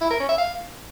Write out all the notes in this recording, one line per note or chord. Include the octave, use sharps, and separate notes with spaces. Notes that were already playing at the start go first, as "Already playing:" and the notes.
E4
A#4
C#4
E5
F5